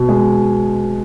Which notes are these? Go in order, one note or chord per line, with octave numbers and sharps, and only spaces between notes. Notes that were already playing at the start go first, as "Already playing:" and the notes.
Already playing: B2
G#3